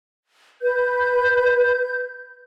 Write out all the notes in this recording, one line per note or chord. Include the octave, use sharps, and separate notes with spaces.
B4 G6